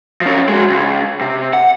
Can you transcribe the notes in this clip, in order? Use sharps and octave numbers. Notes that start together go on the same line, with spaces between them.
F3 C#4
G#3 F#4
C#2
C3
F#5